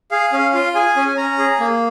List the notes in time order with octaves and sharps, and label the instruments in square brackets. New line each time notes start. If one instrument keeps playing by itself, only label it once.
[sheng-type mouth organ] G#4 F5
C#4 F5
F4 F5
G#4 G#5
C#4
G#5
C#4 A#5
G#4
A#3